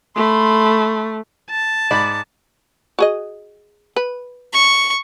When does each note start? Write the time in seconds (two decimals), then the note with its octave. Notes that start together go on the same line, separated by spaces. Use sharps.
0.16 A3 B5 C6
1.50 A5
1.91 G#2 D5 B5
2.99 F#4 G#4 D#5
3.96 B4
4.54 C#6